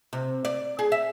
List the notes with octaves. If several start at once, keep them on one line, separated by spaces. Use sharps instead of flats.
C3
D5
G#4
E5